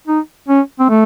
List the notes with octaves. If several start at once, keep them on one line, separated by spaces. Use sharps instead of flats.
D#4
C#4
C4
A3